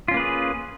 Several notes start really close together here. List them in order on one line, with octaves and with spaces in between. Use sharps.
F4 C#4 A#3 B4 G#4